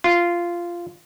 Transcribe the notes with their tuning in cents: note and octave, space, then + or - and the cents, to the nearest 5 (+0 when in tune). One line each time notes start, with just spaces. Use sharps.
F4 -10